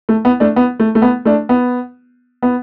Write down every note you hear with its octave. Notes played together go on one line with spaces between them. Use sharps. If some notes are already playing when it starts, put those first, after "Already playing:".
A3
B3
A3 D4
B3
A3
A3
B3
A3 D4
B3
B3